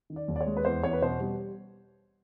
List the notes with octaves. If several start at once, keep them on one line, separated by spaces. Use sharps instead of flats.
D#3
D5
D#2
D5
C#5
G#3
B4
E2 C5
E2 C#5
B4
B2 C5
G3